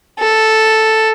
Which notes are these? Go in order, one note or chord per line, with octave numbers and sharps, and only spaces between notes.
A4